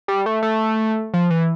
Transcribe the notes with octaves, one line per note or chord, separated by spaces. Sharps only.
G3
A3
A3
F3
E3